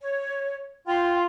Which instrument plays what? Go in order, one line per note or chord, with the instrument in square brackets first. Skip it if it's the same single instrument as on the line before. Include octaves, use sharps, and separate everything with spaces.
[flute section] C#5
[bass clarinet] F4 [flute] G5 [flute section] C6